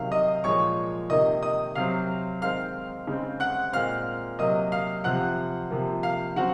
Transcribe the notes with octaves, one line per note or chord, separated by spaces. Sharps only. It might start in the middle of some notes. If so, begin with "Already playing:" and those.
Already playing: C3 D#3 F#3 F5
D#5 D#6
A#2 F3 G#3 C#5 C#6
C3 D#3 A#3 D#5 D#6
D#5 D#6
C3 F#3 C4 F5 F6
D#3 G#3 C4 F5 F6
C#3 G#3 C4
F#5 F#6
A#2 G#3 C4 F5 F6
C3 F#3 A#3 D#5 D#6
F5 F6
C3 F3 C4 F#5 F#6
C3 F3 A#3
F5 F6
C#3 F#3 C4 F#4 F#5